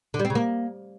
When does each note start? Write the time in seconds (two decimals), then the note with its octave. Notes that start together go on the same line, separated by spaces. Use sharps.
0.14 D3
0.19 G3
0.25 C4
0.30 C#3
0.35 A#3